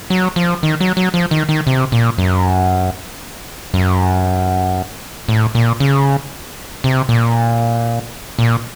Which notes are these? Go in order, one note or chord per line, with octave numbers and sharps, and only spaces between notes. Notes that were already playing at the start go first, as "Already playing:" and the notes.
F#3
F3
D#3
F#3
F#3
F3
D#3
D#3
C3
A#2
F#2
F#2
A2
A#2
C#3
C3
A#2
A#2